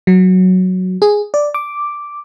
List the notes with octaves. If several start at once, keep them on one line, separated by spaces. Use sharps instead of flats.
F#3
G#4
D5
D6